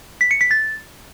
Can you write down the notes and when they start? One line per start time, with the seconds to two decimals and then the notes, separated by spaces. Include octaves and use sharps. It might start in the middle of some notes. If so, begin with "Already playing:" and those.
0.21 B6
0.31 C#7
0.41 B6
0.51 A6